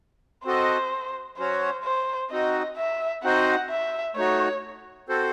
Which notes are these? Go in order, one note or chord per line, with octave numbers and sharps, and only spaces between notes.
C4 F#4 A4 C5 D#5
F#3 C#4 F#4 C5 C#5
C5
C4 D#4 F#4 D#5
E5
C4 D#4 F#4 C5 D#5 F#5
E5
A3 D#4 F#4 C#5
C4 F#4 A4 C5